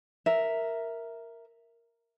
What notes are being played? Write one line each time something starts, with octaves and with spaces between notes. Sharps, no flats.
A#4 E5